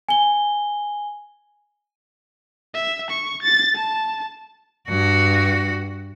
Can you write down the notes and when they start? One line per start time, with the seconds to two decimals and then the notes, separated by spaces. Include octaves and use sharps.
0.09 G#5 G7
2.74 E5
3.11 C#6
3.43 A6
3.76 A5
4.88 G2 F#4